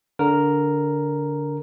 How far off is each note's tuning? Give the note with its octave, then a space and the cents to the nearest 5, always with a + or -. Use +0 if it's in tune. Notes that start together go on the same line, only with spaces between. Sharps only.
D3 -20 A#4 +0